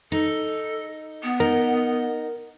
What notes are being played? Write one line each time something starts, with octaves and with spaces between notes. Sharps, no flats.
D#4 A4
B3
D#4 A#4